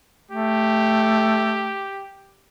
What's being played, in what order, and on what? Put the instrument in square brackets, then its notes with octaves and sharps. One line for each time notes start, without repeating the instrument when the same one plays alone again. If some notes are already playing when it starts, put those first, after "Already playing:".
[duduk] A3 [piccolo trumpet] G4